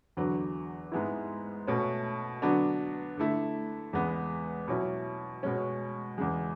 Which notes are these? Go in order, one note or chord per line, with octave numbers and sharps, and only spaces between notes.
E2 D3 F#3 B3
G#2 G#3 B3 E4
B2 A3 C#4
D3 F#3 B3 D4
D3 A3 E4
E2 C#3 G#3 B3
B2 F#3 C#4 E4
B2 G#3 C#4
E2 C#3 G#3